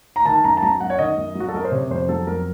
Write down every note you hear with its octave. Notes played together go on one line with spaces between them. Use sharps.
A#5
D#3 A5
F#2 A#5
A5
F#3 A#5
F#2 F#5
C#5
D#3 D#5
F#2
F#3
F#4
A4
F#2 A#4
C5
C3 C#5
F2 C5
F#3 A4
F2 A#4